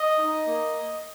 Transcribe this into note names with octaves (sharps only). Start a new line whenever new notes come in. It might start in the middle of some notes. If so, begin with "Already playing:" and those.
Already playing: D#5
D#4
A#3